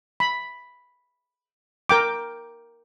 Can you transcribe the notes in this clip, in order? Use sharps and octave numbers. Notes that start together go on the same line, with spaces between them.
B5
A#4 G5 D6